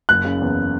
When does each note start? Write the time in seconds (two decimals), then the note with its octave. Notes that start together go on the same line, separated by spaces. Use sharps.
0.09 F#1 F#6
0.25 C#3
0.41 E2